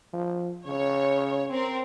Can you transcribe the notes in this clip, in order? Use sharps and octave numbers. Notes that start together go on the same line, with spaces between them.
F3
C#3 C#5
C4 A#4